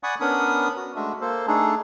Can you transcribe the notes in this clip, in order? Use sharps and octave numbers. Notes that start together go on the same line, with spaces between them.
D5 F#5 G#5 B5 C#6 D#6
B3 C#4 D4 A#4 B5 D#6
F#4
G#3 A3 D4 F#4 E5
A#3 A4 C5
A3 D4 D#4 G#4 A4